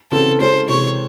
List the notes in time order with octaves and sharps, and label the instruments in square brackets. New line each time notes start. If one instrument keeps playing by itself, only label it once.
[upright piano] C#3 E3 C4 F#4 [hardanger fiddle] A4
[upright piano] G#3 C#4 E4 A4 [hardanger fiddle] C5
[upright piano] C3 E3 G#3 [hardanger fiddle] C#5